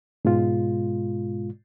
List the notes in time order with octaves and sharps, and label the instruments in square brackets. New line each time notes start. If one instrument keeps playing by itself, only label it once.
[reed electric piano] G#2 B2 G#3 F4